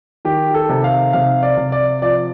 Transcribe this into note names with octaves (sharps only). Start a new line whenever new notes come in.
D#3 G4
A4
C3
F5
C3 F5
D5
C3
D5
F3 D5